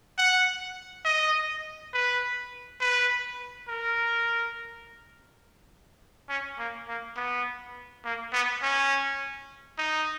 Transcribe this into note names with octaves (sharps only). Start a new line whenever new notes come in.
F#5
D#5
B4
B4
A#4
C#4
A#3
A#3
B3
A#3
B3
C#4
D#4